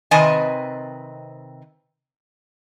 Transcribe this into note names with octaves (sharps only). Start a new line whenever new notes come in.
C3 D#3 C4 B4 D#5 G#5